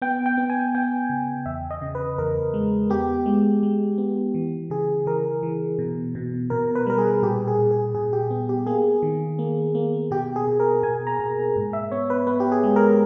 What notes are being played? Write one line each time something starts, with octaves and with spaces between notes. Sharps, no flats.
B3 G5
G5
B3
G#5
B3 G5
C#3
E2 E5
D#5
C#3
B4
E2 A#4
G#3
B3 G4
G#3
G#3
B3
E3
C#3 G#4
E3 A#4
E3
B2
B2
B2 A#4
B4
G3 A#4
G#4
A#2 G4
G#4
A#2
G#4
A#2 G#4
G4
B3
G4
A#3 G#4
D#3
A#3
A#3
B2 G4
G#4
B2
A#4
B2 G#5
A#5
B2
G#2
E5
B3 C#5
B4
B3 B4
G4
G#4
G#3
A#4